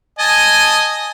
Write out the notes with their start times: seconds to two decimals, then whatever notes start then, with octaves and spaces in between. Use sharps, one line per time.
0.19 D#5 G#5 A5